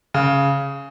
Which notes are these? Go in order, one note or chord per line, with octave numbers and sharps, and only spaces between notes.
C#3